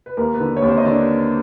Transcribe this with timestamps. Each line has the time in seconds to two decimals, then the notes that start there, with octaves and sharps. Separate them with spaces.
0.06 B4
0.17 D#2 A#3 A#4
0.34 B3 B4
0.40 D3
0.57 C#5
0.62 D#2
0.68 C4 C5
0.78 D#5
0.85 D3 D4 D5